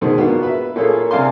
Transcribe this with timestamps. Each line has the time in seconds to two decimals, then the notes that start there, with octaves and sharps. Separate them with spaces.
0.01 G#2 B2 D#3 G#3 C5
0.18 A#3 B3 D4 F4 F#4
0.43 B4 E5
0.76 A#2 A#3 F4 G#4 A4 C#5
1.11 C3 D5 F5 G#5 C6